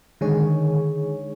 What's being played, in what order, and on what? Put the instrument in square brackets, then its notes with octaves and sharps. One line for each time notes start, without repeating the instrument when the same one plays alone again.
[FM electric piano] D3 D#3 G#3 G#4 C#5